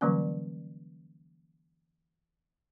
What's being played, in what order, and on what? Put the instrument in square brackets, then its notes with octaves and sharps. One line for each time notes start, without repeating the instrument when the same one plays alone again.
[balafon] D3 E3 F#3 G3 A#3 C#4